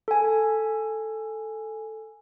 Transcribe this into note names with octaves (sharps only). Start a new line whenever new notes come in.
A4 G#5